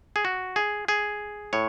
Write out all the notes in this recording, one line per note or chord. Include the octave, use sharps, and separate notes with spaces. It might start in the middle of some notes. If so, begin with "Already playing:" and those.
G#4
F#4
G#4
G#4
A2 C#5